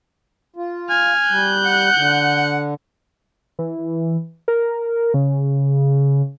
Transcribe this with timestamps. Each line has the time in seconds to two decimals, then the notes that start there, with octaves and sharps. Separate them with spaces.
0.56 F4
0.90 G#5 F6
1.29 G3 F#6 G6
1.66 F#5
1.96 D3
3.59 E3
4.48 A#4
5.14 C#3